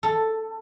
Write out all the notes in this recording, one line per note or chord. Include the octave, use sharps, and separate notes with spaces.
A4